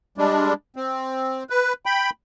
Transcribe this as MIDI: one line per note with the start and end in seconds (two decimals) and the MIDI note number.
0.18 0.53 55
0.18 0.53 56
0.18 0.53 62
0.76 1.44 60
1.50 1.73 71
1.86 2.10 79
1.86 2.10 83